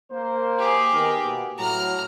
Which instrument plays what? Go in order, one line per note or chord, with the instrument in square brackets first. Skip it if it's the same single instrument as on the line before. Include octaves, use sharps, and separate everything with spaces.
[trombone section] A#3 C5
[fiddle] G4 G#4
[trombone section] D#3 B3 A#4
B2 A#3 B3
[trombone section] A2 F#3 [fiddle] A#5 F6